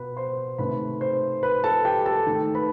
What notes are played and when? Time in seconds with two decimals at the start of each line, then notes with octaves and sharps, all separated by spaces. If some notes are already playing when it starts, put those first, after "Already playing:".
Already playing: B2 B4 B5
0.17 C5 C6
0.58 C3 D#3 A3 B4 B5
1.01 C5 C6
1.43 B4 B5
1.64 A4 A5
1.85 G4 G5
2.06 A4 A5
2.27 D#3 A3
2.55 B4 B5